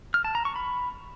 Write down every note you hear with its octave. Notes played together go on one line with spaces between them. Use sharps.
F6
A5
A#5
C#6
B5